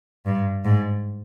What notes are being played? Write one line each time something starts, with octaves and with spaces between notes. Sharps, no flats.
G2
G#2